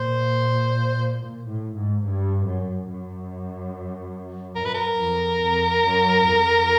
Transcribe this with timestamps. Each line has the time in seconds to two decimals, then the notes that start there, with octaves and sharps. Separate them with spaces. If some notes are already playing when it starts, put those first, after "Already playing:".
Already playing: A#2 C5
1.18 A#2
1.46 A2
1.74 G#2
2.03 G2
2.45 F#2
2.87 F#2
4.56 F#2 A#4
4.65 B4
4.75 A#4
4.98 F2
5.41 F2
5.83 F#2
6.26 F2